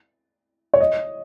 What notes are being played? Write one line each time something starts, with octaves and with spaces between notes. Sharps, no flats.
C#5
D#5